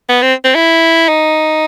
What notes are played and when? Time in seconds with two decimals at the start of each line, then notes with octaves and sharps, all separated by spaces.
0.09 B3
0.22 C4
0.44 C4
0.55 E4
1.08 D#4